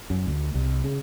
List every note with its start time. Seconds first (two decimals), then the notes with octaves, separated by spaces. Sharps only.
0.10 F#2
0.27 D2
0.54 C2
0.84 C#3